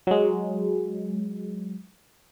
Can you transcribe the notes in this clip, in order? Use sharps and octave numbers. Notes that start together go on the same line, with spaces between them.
F#3 G#3